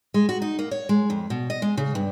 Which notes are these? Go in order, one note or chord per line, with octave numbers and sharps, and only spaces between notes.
G#3
F#4
D#4
A#3
C#5
G#3
F2
B2
D#5
G#3
C#3
G2